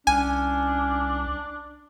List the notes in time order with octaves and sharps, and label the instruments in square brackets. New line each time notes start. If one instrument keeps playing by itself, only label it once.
[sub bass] C2 [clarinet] C#4 [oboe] D4 [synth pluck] G#5